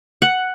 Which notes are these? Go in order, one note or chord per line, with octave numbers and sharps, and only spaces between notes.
F#5